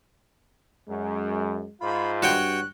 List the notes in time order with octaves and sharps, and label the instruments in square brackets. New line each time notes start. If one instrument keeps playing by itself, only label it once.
[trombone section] F#2 [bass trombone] G#3
[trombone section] G#2 F4 [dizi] B5
[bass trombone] G2 [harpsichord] F#4 C#5 G5 [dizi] F#6